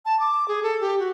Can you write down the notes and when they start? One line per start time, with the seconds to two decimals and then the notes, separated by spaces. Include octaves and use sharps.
0.05 A5
0.20 D6
0.48 G#4
0.63 A4
0.81 G4
0.99 F#4